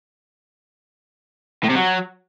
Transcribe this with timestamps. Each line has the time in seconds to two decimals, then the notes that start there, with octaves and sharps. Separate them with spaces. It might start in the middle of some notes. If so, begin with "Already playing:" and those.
1.64 A2
1.69 C3
1.75 F#3